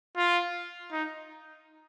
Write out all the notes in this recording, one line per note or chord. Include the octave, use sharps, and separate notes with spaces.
F4
D#4